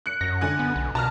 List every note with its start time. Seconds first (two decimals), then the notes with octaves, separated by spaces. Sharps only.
0.06 F#6 C#7
0.21 F#2 A#6
0.41 D3 G#5 F#6
0.59 B3
0.76 B1
0.95 B2 A5 A#5 F6